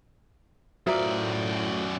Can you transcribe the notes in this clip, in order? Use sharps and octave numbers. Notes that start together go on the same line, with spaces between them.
F#2 A2 F4 F#4 A#4 D5 E5